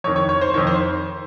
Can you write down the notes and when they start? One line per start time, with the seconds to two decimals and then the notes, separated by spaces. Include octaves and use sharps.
0.04 F2 C#5
0.07 D#3
0.16 C#5
0.29 C#5
0.41 C5
0.54 F2 D#3 C#5
0.67 C5